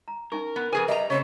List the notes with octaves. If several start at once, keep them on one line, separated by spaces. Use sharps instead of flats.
A#5
C#4 D#4 A#4 C#6
B3
F2 G#4 A4 B4 G#5
G3 D#5 E5 A#5
C#3 A3 C4 C#5